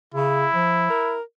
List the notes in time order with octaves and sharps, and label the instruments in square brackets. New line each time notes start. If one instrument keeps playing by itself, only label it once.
[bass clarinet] C#3 [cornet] E4
[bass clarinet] F3
A#4